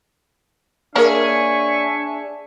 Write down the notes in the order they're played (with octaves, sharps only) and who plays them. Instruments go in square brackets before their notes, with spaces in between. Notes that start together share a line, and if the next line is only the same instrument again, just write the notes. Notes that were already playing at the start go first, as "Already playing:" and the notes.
[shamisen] A#3 A#4 [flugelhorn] D4 [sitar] G#4 C#5 [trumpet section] E5 G#5 C#6